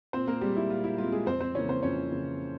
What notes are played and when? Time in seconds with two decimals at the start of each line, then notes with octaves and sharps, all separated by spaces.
0.13 A#2 C4 C5
0.27 A#3 A#4
0.41 G3 G#3 C4 G4
0.57 E4
0.70 A#2 F4
0.84 E4
0.98 G#3 C4 F4
1.12 G#3 G#4
1.26 F2 C4 C5
1.40 C4 C5
1.55 C#3 E3 A#3 C#4 C#5
1.68 C4 C5
1.83 F2 C#4 C#5
2.11 C#3 E3 A#3